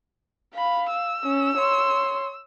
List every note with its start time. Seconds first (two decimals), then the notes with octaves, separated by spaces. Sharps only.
0.55 F5 B5
0.89 E6
1.24 C#4
1.58 C#5 C6